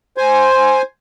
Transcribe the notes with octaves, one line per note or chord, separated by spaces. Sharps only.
C5 G#5